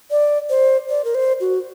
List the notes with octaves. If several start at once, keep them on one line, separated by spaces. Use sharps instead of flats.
D5
C5
D5
A#4
C5
F#4